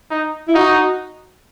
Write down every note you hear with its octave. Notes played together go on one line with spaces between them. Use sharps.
D#4
E4
D#4 F#4